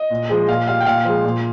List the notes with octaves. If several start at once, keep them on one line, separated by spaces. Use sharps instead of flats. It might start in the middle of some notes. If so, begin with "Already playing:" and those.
Already playing: D#5
A#2
F3 G#3
A#2 F5
G3 F5
G5
A#2 F5
F3 G#3
A#2